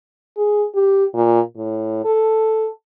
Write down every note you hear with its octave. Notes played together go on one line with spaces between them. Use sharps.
G#4
G4
A#2
A2
A4